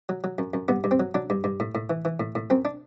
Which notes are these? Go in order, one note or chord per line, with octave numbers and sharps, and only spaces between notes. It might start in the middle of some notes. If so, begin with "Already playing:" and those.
F#3
F#3
F#2
F#2
G2 B3
G2
C4
F#3
F#3 D4
G2
G2
A2
A2
E3
E3
A2
A2
F#2 C4
D4